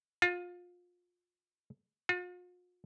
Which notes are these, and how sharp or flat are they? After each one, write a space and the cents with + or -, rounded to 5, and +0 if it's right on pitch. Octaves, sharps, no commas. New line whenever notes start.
F4 +25
F4 +45